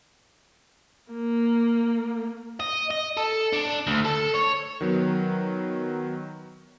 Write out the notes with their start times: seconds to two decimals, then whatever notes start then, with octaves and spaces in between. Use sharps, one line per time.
1.12 A#3
2.60 D#5
2.91 D#5
3.17 A4
3.53 D4
3.87 D2
4.05 A4
4.35 C#5
4.81 D#3 F#3 B3